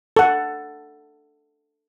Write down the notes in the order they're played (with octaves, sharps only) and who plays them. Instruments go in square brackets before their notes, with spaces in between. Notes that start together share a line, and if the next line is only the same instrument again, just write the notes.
[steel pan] A4 F#5